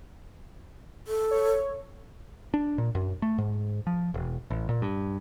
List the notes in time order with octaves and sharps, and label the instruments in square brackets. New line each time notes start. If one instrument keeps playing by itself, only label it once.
[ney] A4
[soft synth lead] C#5
[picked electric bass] D4
A#2
F#2
A3
G#2
F3
E1
A1
A#2
G2